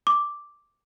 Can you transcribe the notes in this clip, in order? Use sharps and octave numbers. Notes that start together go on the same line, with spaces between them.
D6